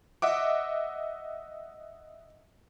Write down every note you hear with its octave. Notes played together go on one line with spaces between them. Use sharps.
D#5 E5 F#5 D6